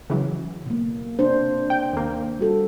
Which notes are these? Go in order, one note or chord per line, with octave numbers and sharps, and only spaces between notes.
C#3 E3 F#3
B2 A#3
C3 D4 C5
G5
D#2 A#3
G3 F#4 A4